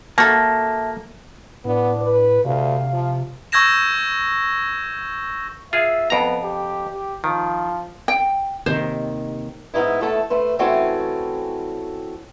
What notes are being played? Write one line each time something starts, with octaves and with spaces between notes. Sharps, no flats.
A#3 F#4 A4 E5 A5
A2 B3 D4
B4
D2 C3 F5
F3
C#6 E6 G6 G#6 A#6 E7
F4 G#4 E5
F2 B3 A#5
G4
G4
D#3 F3
G5
D#2 C3 D#3 C5
G#2 B3 C4 D#4 E4
E2 A3 E4 A4 A5
A3 B4 C5
E3 A3 C4 C#4 F#4 A4